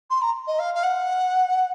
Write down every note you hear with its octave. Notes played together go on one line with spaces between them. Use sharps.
C6
A#5
D#5
F5
F5
F#5